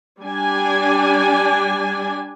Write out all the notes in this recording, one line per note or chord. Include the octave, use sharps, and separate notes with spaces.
G3 D4 G#5